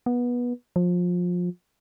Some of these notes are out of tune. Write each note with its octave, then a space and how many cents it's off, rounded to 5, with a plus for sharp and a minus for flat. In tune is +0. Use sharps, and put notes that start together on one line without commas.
B3 -20
F3 +25